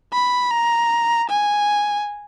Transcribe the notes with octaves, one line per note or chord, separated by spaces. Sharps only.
B5
A#5
G#5